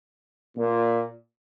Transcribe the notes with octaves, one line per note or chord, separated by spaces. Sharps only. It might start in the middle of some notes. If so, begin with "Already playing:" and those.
A#2